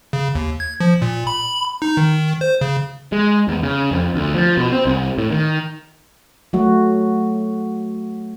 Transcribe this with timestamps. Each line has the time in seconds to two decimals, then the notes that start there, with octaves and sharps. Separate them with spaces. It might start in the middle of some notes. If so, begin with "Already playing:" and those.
0.13 C#3
0.35 D#2
0.60 G#6
0.80 F3
1.02 A#2
1.27 B5
1.82 D#4
1.97 D#3
2.41 C5
2.61 C#3
3.12 G#3
3.48 E2
3.63 C#3
3.91 F2
4.14 D2
4.34 F3
4.57 B2
4.72 C4
4.85 C2
5.18 A2
5.31 D#3
6.53 F#3 A3 F#4